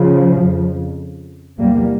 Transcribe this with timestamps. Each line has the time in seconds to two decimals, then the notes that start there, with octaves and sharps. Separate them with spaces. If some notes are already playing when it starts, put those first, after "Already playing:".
Already playing: C#3 F3
0.37 F2 C#3
1.59 E2 C3 G3 A#3